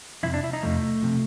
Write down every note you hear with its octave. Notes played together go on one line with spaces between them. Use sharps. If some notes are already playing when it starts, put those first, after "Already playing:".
F2 C3 F3 E4
D4
E4
D#4
F2 C3 F3 A3
C3 F3